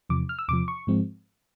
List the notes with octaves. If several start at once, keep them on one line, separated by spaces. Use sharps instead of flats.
E2 C3 F3 D6
F6
E6
E2 C3 F3 D6
C#6
G#2 F3 G#3 C4